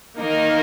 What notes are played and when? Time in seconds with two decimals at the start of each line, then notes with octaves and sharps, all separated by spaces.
0.18 D#3 A#3 D#4 A#4